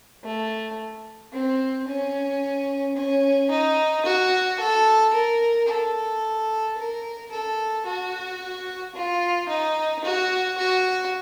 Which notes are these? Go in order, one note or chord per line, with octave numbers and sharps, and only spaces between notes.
A3
C4
C#4
C#4
D#4
F#4
A4
A#4
A4
A#4
A4
F#4
F4
D#4
F#4
F#4